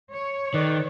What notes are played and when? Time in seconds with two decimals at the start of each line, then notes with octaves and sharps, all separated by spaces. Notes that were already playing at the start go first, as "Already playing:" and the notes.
0.12 C#5
0.54 D#3 A4 B4 D5